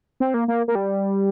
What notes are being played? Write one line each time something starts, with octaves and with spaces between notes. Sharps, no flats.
C4
A#3
A#3
A#3
G3